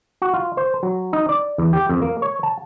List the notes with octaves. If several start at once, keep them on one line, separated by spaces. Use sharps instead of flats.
F#4
F4
C5
F#3
D#4
D5
E2
G4
F2
A#3
C#5
A5